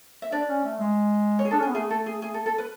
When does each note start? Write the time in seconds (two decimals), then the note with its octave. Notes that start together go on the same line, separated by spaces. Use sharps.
0.22 E5
0.32 D4 D5
0.48 C#4
0.64 A3
0.79 G#3
1.39 C#5
1.45 G#4
1.51 D4 A4
1.59 C#4
1.63 G#4
1.68 B3
1.74 A3 G#4
1.90 A4
2.06 G#4
2.22 G#4
2.34 A4
2.46 A4
2.58 B4